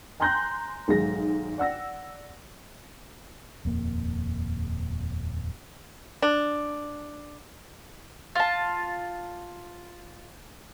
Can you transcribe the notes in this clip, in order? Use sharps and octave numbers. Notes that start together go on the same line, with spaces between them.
G#5 A#5 C6 F#6 G6 A#6
B1 G#2 D#3 G#3 A#6
D5 F#5 E6 A#6
D#1 F2 A#3
D4
F4 A5